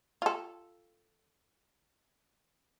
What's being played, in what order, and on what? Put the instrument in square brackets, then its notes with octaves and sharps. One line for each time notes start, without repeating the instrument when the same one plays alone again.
[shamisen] F4 A4